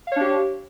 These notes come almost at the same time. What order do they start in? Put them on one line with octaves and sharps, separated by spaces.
F5 C#5 D4 G4